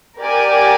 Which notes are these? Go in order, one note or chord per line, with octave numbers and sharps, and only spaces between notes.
G4 A#4 D5 G#5